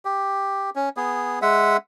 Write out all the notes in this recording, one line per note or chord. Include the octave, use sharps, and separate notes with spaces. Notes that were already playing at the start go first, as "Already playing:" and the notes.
G4
C#4
B3 G#4
G#3 E5 F#5